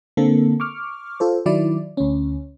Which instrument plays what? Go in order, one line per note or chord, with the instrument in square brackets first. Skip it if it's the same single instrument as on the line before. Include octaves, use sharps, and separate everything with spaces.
[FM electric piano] D3 A#3 C4 A4
C#6 D6 F6
F4 A4 C5
D#3 F#3 E4 D5
D2 C#4